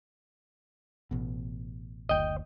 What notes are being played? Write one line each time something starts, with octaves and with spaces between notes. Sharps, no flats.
A1 B2
F#1 D2 D#5 G5